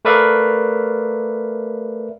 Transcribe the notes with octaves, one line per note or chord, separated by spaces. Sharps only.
A3 A#4 B4 D5 E5 F5